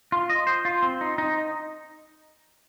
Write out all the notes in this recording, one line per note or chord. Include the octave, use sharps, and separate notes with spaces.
F4
D#5
C5
F4
C4
D#4
D#4